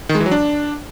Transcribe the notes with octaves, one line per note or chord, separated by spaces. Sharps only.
D#3
G#3
E3
F#3
D4